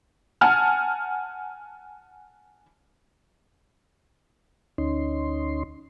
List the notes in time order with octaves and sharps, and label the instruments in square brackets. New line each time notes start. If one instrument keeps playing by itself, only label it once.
[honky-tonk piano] F#5 G#5 A5 F6
[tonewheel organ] D2 C#4 D#4 C6